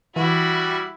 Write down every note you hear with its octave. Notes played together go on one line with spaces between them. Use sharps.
E3 G3 E4 F#4